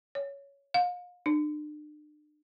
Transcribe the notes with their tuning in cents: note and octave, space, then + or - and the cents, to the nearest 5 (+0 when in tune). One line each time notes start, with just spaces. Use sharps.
C#5 +10
F5 +35
D4 +40